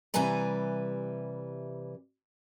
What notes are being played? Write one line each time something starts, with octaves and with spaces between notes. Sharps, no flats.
C3 E3 G3 B4 G#5 A#5